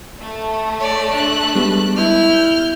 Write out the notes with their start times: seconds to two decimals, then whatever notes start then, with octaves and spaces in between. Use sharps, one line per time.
0.20 A3
0.79 C#5 D5
1.13 D4 F#6
1.55 G3 G#3 B3
1.96 E4 F6 G6